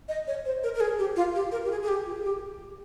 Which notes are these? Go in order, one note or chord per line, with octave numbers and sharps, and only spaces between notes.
D#5
C#5
C5
A#4
A#4
G#4
G4
F4
G4
A#4
G4
G#4
G#4
G4
F4
G#4
G4